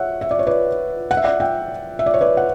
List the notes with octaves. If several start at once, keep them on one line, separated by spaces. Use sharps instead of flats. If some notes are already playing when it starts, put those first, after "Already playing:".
Already playing: C#5 E5 F#5
E5
D5
C#5
B4 D5
F#5
E5
D5 F#5
E5 G5
E5
D5
C#5
B4 D5
F#5